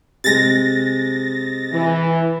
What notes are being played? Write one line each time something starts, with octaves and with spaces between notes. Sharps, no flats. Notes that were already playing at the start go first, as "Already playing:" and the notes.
C3 G#3 A6 A#6
E3